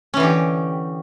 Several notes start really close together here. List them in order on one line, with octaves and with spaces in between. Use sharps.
C#4 E3 D3 G4